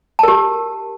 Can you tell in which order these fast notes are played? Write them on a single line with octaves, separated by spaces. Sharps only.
A5 A#4 G4